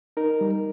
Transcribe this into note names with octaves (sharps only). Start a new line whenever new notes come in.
D#4 A#4
G3